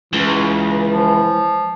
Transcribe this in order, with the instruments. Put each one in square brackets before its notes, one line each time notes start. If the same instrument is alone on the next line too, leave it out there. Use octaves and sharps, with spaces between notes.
[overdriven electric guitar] C#2 [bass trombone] E3
[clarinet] F3